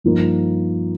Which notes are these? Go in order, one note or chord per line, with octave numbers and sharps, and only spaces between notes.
G2 F3 A#3 D#4